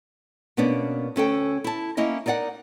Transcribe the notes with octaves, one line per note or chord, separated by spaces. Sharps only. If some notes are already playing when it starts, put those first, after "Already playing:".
B2 A#3 B3 C#4 D4
D2 C#4 A4 G5
E4 A5
A#3 C#4 E4 D#5
D#4 A#4 D5 E5 F#5